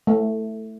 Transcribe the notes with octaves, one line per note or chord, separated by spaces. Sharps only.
A3